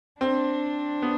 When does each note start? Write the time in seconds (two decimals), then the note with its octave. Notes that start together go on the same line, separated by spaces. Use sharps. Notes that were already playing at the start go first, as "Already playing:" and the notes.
0.21 C4 D4
1.02 B3